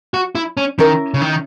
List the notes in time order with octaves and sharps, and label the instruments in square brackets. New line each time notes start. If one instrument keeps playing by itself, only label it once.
[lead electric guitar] F#4
E4
C#4
[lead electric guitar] D#3 [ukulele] C#4 E4 A#4
[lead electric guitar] C#3
D#3